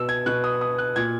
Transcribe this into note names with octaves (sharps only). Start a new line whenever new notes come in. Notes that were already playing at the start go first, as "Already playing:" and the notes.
Already playing: B2 E6
G#6
B2 F#6
D#6
D#6
F#6
A#2 G#6